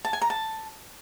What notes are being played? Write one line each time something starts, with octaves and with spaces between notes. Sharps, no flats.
A5
G#5
A#5
A5